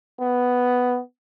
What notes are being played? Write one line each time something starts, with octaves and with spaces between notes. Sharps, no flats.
B3